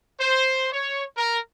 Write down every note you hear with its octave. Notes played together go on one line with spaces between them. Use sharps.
C5
C#5
A#4